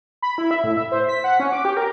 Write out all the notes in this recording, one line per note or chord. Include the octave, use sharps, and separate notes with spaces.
B5
E4
E5
A2
E5
C5
B6
F#5
C#4
D6
G4
A#4